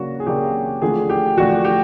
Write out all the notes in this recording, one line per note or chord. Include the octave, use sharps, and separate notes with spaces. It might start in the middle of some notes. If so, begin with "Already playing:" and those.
Already playing: C#3 F#3 A#3 D4 F#4
G#4
C#3 F#3 A#3 D4 G4
D3 F3 A3 D4 G#4
G4
D3 F3 A3 D4 F#4
G4